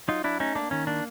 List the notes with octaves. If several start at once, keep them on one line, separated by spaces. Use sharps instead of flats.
F#3 D#4 F4
F#3 D4 E4
A3 C#4 D#4
A#3 D4
D#3 C#4
A#3 D4